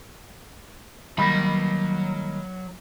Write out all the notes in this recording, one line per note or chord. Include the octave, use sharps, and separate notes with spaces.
D#3 F#3 G3 A#3 B5